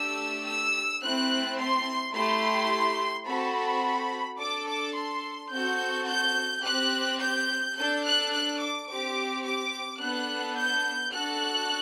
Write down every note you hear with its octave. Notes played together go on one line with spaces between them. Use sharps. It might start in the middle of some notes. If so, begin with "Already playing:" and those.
Already playing: A3 D4 G4 E6
E6
A3 C4 E4 F#6
C6
A3 E4 G4 C6
C4 F#4 A4 B5
D4 A4 D6
D6
C6
C4 F#4 A4 G6
G6
C4 G4 F#6
G6
D4 A4 G6
F#6
F#6
D6
C4 G4 D6
D6
B3 D4 A4 F#6
G6
D4 F#4 A4 F#6